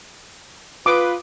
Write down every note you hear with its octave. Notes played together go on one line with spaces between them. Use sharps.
F4 B4 D6 D#6